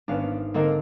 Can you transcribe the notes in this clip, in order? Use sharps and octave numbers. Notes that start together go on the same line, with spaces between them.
G#1 B3 C#4 D4 F5
D3 A#3 C4 D4 D#4 A#4